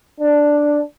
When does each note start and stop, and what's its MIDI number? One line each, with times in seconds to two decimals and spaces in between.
0.19 0.79 62